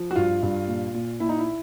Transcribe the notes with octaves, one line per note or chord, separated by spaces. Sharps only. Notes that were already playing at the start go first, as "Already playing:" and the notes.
Already playing: F3
F#4
G2 F4
G2
A#2
A#2
A#2 E4
D#4
E4